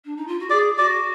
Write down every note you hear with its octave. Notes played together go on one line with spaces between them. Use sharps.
D4
D#4
F4
F#4
G#4 D5
F#4 D5